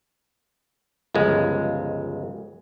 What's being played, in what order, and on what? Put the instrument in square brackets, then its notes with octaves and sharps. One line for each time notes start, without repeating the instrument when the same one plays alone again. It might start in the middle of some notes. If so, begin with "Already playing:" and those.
[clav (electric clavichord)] G1 C#2 F3 G#3